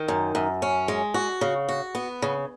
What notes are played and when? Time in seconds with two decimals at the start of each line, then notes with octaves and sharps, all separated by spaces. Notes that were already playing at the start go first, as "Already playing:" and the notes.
Already playing: D#3
0.08 F#2
0.35 F#2
0.62 C#4
0.88 G#3
1.14 F#4
1.41 C#3
1.69 F#4
1.95 B3
2.22 C#3